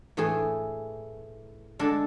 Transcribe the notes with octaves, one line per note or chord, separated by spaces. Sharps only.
A2 E3 A3 G#4
D3 G#3 D4 A4